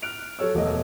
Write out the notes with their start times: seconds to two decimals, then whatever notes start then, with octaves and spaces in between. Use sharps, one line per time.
0.02 F6 F#6 D7 F7
0.39 F#3 A4 C#5 E6
0.55 E1 A3 D#5